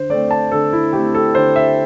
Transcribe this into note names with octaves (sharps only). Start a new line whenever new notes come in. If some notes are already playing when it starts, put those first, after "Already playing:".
Already playing: D3 C5
A3 C4 D5
A5
D3 A4
E4
A3 C4 G4
A4
D3 C5
E5